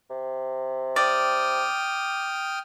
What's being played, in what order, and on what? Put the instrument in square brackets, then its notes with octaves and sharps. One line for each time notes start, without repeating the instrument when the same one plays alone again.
[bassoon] C3
[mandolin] D5 [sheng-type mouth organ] G5 D#6 F6